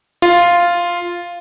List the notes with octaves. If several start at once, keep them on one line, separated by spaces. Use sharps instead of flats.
F4